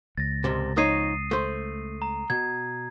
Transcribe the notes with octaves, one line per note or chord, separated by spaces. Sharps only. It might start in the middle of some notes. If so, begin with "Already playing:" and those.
C#2 A6 A#6
C2 G#2 C3
F2 D#4 C#5 D#6 C7 D#7
A3 C5
A#5
B2 G#6